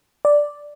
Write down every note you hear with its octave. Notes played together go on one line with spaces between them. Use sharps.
D5